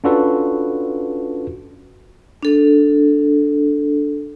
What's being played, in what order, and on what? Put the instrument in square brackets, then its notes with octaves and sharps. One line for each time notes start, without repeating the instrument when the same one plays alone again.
[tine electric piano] C#4 D4 F4 F#4 A4 B4
[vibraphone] D4 A4